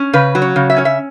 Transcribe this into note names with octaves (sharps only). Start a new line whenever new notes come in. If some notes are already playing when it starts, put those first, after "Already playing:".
Already playing: C#4
C#3 B4
F#3
C#5
C#3
E5
C#4 C#5
E5